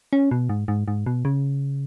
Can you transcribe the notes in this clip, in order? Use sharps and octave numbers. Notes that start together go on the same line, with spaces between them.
C#4
B2
G#2
G#2
G#2
B2
C#3